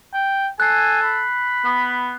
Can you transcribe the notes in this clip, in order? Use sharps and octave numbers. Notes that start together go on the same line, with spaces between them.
G5
A4 G#5 F#6 C7
B5
B3